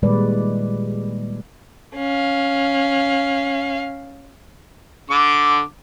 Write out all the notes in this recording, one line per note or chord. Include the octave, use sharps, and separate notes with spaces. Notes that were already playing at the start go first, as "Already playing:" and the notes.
A#2 D#3 G3 G#3 B4 D5
C#4 F5
D3 D6